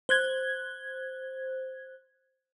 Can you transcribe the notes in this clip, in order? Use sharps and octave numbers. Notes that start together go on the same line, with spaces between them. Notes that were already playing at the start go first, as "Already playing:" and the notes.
C5 F#6 G#6